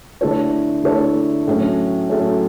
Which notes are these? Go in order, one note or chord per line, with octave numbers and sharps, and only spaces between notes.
D3 A3 E4 A4 C#5
D3 A3 E4 A4 C#5
A2 F#3 A3 C#4
A2 F#3 A3 C#4